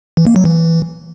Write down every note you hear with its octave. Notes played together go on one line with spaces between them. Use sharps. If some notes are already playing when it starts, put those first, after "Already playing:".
E3
A#3
F#3
E3